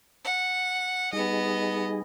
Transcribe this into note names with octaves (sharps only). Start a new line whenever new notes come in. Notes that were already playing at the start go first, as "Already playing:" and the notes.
F#5
G3 B3 D#4 G#4 D#5